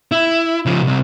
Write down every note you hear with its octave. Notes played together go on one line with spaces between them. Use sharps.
E4
C#3 F3
C2 C3